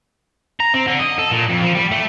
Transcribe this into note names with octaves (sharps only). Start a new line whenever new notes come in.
A#5
C4
D3
D#5
A4
A#2
F2
F3
G3
A3